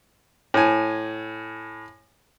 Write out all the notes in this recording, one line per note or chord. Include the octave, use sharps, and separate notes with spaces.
A2 G#5